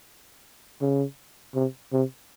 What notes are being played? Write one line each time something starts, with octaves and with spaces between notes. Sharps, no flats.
C#3
C3
C3